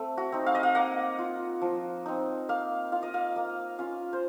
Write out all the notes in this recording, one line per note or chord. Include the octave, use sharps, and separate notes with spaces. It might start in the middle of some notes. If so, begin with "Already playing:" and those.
Already playing: A3 C4
F#4
C4 D#4
F5
D#5
F5
A#3 F#5
F4
F3
C4 D#4
A#3 F5
F4 F5
D#5
F5
A#3
C#4 F4 F5
C5